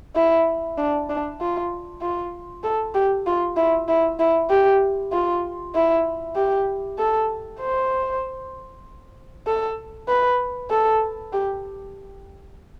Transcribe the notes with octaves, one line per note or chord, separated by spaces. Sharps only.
E4
D4
D4
F4
F4
A4
G4
F4
E4
E4
E4
G4
F4
E4
G4
A4
C5
A4
B4
A4
G4